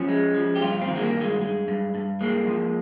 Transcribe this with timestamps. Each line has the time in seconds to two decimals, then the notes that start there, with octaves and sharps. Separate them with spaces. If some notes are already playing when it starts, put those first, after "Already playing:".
Already playing: F3 C#4
0.08 G#3
0.35 F3
0.56 G4
0.61 G2 F4
0.82 C4
0.88 D#3
0.96 G#3
1.01 A#3
1.15 G2
1.21 G#3
1.41 G#3
1.68 G2
1.95 G2
2.21 G#3 A#3
2.47 F3